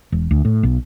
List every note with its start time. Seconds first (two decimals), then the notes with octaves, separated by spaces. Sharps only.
0.12 E1
0.31 D2
0.45 A2
0.63 B1